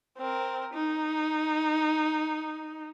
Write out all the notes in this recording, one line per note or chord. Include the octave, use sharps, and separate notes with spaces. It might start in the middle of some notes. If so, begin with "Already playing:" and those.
C4 A#4
D#4